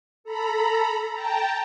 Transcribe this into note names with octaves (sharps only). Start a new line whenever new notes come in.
A4 A#5 B5
G5 A5 A#5